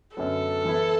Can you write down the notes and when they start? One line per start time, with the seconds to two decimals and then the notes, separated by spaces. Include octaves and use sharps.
0.16 F#2 D3 F#3 B3 A4
0.65 E3 B3 E4